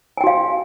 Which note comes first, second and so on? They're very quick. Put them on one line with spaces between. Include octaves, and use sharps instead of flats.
G#5 G5 F#4 F5